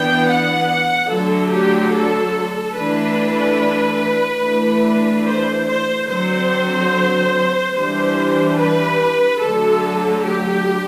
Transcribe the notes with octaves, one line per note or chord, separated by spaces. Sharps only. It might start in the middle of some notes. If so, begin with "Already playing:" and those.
Already playing: E3 B3 D4 G5
F#5
D3 F#3 A3 D4 A4
G4
A4
E3 A3 D4 B4
E3 A3 D4
C5
C5
D3 F#3 C4 C5
E3 G3 D4 C5
B4
D3 F#3 A3 A4
G4